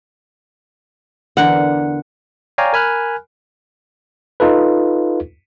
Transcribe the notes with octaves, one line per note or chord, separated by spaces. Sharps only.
E2 D3 A#4 F#5
C#5 D5 F5 G5 G#5 A#5
A#4 G#5 B5 F6 F#6
D#4 F4 A4 B4